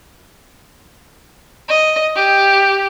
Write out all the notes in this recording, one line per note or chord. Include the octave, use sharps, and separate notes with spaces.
D#5
G4